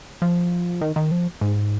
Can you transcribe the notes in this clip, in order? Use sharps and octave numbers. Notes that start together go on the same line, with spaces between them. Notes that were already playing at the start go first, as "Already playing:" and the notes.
F3
D#3
D#3
F3
G#2